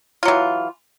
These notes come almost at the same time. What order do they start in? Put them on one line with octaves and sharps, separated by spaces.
F4 F#3 E3